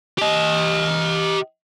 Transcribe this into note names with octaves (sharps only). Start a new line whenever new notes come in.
G4 D#5